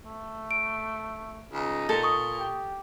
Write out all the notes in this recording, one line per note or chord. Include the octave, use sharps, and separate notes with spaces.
A3
D7
C#2 D#4
A#2 A4
C#6 D#6
G4